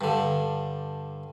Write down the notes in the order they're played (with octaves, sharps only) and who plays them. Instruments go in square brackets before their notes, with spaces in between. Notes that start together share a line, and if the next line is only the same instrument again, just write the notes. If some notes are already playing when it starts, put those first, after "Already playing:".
[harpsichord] G2 D3